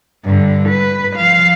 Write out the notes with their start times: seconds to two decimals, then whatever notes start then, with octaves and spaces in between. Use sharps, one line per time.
0.25 G2 D3
0.69 B4
1.16 F3 F5